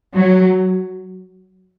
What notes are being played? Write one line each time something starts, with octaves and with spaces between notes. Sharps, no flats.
F#3